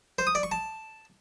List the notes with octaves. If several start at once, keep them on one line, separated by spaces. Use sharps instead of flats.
C5
D#6
D5
C#6
A5